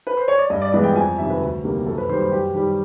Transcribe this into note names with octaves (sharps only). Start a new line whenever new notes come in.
B4
C5
C#5
D5
G2 D#5
D5
E3 G#3 B3 D5
G5
F2 G#5
C3 D#3 E5
B4
D2
C3 D#3 G3 A#3
F#2 A4
B4
D#3 G3 C5
C5
F#2 G4
D#3 G3